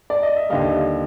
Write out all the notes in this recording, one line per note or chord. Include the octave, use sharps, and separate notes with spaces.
D5
D#5
E5
D#2 D3 G3 D#5 F5